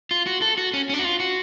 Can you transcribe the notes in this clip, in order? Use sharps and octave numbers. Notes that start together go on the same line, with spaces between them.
F4
F#4
A4
F#4
C#4
C#4
D4
F#4
F4
F#4